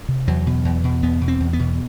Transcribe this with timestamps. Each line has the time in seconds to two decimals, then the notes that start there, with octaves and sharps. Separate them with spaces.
0.09 C3
0.27 E2 F#3
0.47 B2
0.65 E2
0.84 B2
1.03 E2 B3
1.21 B2
1.28 C4
1.40 E2
1.53 B3
1.59 B2